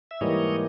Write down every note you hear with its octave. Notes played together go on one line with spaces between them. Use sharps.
E5
G#2 E3 G3 A#3 C#5 D#5